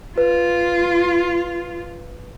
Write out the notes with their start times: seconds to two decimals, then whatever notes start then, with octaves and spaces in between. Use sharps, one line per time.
0.18 F4 B4